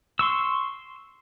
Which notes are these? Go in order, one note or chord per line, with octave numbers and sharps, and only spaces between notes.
C6 C#6 E6